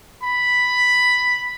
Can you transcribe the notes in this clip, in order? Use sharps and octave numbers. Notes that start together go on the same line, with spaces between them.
B5